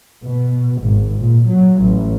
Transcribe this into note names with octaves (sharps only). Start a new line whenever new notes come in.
B2
G#1
A#2
F#3
A1